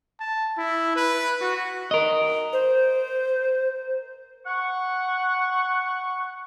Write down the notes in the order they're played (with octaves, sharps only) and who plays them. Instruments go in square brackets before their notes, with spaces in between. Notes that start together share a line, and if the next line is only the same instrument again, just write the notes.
[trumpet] A5
E4
B4
F#4
[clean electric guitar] A#4 D#5
[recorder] C5
[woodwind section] F#5 C#6